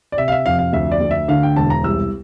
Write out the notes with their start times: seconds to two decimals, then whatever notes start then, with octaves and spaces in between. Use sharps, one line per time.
0.12 D5
0.17 C3 E5
0.28 F5
0.32 E5
0.46 F2 F5
0.59 F5
0.73 D2 E5
0.92 D5
1.01 D2
1.11 E5
1.28 D3 F5
1.43 G5
1.56 E1 A5
1.70 A#5
1.84 C2 E6